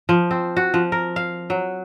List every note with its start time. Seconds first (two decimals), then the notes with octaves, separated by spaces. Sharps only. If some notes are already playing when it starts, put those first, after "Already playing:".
0.09 F3
0.31 C4
0.57 F#4
0.74 F3
0.92 A#4
1.16 F5
1.50 F#3